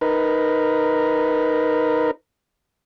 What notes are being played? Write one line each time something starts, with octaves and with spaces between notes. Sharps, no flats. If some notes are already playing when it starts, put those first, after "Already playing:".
D#4 A#4 B4